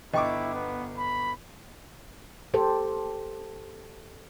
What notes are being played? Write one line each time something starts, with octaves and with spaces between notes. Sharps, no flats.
G1 E4 D#5 G5 C#6 D6
B3
B5
G4 A4 C5